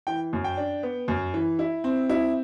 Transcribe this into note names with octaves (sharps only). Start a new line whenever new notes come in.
E3 G5
F#2
G5
D4
B3
F#2
E3
E4
C4
E4